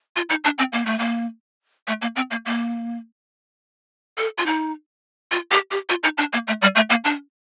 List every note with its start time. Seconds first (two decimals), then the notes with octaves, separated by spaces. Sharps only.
0.16 F4
0.30 D#4
0.44 D4
0.58 C4
0.73 A#3
0.86 A3
0.99 A#3
1.87 A3
2.02 A#3
2.16 C4
2.31 A#3
2.46 A#3
4.18 A4
4.38 F4
4.46 D#4
5.32 F4
5.51 G4
5.71 G4
5.89 F4
6.03 D#4
6.18 D4
6.33 A#3
6.48 A3
6.62 G3
6.76 A3
6.90 A#3
7.05 D4